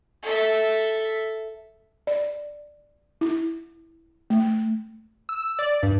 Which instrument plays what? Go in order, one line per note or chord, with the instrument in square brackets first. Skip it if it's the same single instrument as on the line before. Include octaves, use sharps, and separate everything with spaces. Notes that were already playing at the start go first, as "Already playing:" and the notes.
[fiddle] A4 E5
[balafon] D5
E4
A3
[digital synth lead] E6
D5
G2